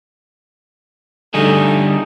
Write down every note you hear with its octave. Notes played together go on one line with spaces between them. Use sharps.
D3 G3 A3 D#4 G#4